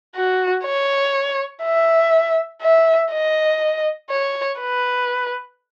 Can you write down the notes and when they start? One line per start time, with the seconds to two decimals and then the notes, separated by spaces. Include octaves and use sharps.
0.16 F#4
0.65 C#5
1.64 E5
2.62 E5
3.12 D#5
4.10 C#5
4.60 B4